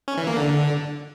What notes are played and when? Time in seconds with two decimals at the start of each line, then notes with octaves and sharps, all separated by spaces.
0.08 C#4
0.17 E3
0.27 A#3
0.37 D3